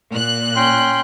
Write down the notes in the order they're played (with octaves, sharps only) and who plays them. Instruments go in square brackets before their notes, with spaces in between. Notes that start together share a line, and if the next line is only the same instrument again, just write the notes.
[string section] A#2 F#6
[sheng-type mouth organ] C#4 G5 C6